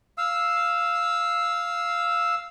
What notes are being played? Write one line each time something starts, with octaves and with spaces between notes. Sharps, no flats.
F5 E6